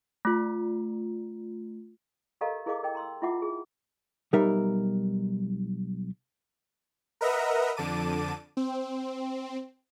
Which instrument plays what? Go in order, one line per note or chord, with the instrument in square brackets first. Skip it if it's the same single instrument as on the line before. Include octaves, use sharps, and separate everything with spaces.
[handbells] A3 F4
[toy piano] G4 A4 A#4 D#5 F5 A#5
E4 G#4 A#4 D#5 F5 D6
A#4 D#5 G5
A#5 C6 E6
E4 F4 E5 F#5 D6
G#4
[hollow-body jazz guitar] B1 G3 D#4 A#4 E5
[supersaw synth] A#4 B4 D#5 E5 F#5 A#5
F2 D3 A5 D6 D#7
C4